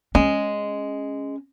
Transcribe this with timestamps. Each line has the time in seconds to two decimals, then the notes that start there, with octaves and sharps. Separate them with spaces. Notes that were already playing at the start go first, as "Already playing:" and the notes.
0.15 G#3 C#4